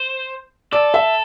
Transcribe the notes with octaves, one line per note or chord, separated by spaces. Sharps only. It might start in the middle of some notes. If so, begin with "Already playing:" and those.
Already playing: C5
A4 D5
E5